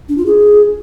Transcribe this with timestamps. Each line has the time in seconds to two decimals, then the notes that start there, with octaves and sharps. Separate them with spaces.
0.09 D4
0.17 F4
0.26 G#4